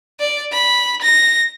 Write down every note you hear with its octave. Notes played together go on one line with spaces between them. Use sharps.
D5
B5
A#6